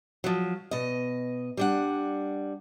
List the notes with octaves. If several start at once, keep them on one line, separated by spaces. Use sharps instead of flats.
F3 F#3
B2 D#5
G3 D4 F#5